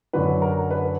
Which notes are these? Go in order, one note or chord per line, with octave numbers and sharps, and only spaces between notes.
F#2 D3 F#3 B4
A#4
B4